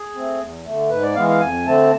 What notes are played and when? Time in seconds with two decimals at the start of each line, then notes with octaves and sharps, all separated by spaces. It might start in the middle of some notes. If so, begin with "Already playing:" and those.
Already playing: G#4
0.14 A3 C4
0.40 E2
0.65 D3 A3
0.90 G#2 B4
1.03 D5
1.15 E3 G#3 B3 F5
1.29 F5
1.40 F2 G#5
1.66 D3 A3 C4 A5